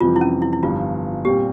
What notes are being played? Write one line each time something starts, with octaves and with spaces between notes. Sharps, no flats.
F2 C3 E3 G3 C4 F4
E4
C#4
E4
E4
G1 G2 F3 F4
A#2 G3 C4 G4